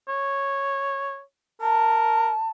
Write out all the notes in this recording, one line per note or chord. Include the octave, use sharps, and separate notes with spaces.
C#5
A#4 A5